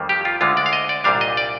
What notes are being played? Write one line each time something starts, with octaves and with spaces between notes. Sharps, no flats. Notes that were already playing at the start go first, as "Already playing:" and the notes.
Already playing: F2 D#3 G3 A#3
G4
F4
D2 D3 G#3 F4
D5
F5
D#5
D5
C2 A#2 G3 D4 F5
D#5
D5